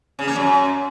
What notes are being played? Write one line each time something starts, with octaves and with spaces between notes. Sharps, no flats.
C#3
A#3
F#2